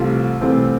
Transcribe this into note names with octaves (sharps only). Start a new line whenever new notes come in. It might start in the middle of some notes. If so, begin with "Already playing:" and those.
Already playing: C2 C3 E3 A3 C4 F4
C2 C3 E3 A3 C4